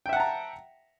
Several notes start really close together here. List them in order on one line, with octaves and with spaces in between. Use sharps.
G5 E5 F#5 A5 A#5